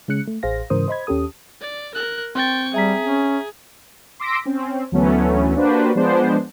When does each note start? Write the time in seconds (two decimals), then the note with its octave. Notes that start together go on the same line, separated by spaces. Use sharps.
0.08 C#3 G#3 C#4 F#6 C#7
0.28 A3
0.43 A1 G#4 C5 F5 A#6
0.70 G#2 C#3 E3 A#4 C5 D#6
0.88 C5 D#5 B5 G#6
1.07 D#2 C#4 G4 A4 D#6
1.61 D5
1.94 A#4 F#6
2.35 C4 G5 C6 C#6 A6
2.74 G3 G#4 E5 A#5 B6
3.05 C#4
4.19 C6 D6 E6 A#6 B6 D7
4.45 C4 C#4
4.92 D2 E3 F#3 A3 B3 C#4
5.56 A#3 D4 F#4 G4 B4 C5
5.95 F3 G#3 B3 D4 C5